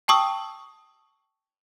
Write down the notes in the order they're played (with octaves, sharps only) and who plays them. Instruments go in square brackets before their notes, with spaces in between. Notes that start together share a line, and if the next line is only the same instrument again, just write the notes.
[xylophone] G5 A5 C#6 D#6 E6